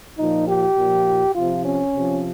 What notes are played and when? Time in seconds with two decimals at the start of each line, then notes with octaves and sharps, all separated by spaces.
0.18 A#2 F3 D#4
0.47 G4
0.77 A#2 F3
1.35 C3 F3 F4
1.65 C#4
1.94 C3 F3